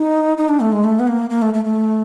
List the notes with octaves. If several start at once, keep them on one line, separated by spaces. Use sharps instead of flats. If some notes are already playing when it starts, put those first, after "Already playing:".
Already playing: D#4
D#4
D4
A3
G#3
A3
B3
A#3
A#3
A3
A3
A3